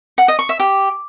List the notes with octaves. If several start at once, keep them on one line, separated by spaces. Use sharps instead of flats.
F#5
D#5
C#6
E5
G4